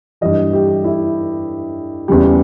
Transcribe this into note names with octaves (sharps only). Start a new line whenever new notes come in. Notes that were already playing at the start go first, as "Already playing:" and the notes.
G2 E3 G3 D#5
G4
E4
E2 C#3 G3